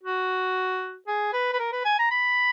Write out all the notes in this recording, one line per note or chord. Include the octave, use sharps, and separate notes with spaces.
F#4
G#4
B4
B4
A#4
B4
G#5
A#5
B5